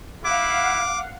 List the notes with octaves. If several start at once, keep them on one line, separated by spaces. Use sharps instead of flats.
E4 F5 F#5 D6